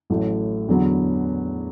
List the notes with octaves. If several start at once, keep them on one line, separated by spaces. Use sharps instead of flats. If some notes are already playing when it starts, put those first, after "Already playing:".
A1 A2 F#3 A3
E2 D3 F#3 B3